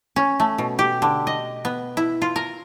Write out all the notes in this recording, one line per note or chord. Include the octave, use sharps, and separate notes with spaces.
C#4
A3
B2
G4
D3
D#5
B3
E4
F4
A#4